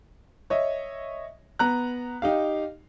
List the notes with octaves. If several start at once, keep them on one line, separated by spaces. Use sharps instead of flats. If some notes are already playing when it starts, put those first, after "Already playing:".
C#5 D#5 E5
B3 A#5 F#6
D#4 G4 F5